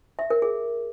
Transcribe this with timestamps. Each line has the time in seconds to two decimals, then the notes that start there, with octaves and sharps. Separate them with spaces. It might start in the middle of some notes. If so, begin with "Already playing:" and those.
0.19 E5
0.30 A#4
0.42 G#4